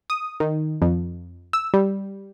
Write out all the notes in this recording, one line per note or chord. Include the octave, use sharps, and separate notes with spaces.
D#6
D#3
F2
E6
G3